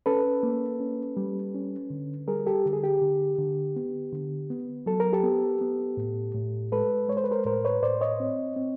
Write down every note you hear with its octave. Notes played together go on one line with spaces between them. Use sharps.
C#4 A4 B4
A#3
C#4
G3
C#4
D3
G3 G#4 A#4
G4 A4
D3
G#4
G4
D3
D3
B3
D3
B3
F#3 A4
A#4
G4 A4
B3
B3
A2
A2
G#3 A4 B4
G#3 C#5
C5
B4
A#4 C5
A2 A#4 C5
B4 C#5
A2 C5 D5
C#5 D#5
C4
C4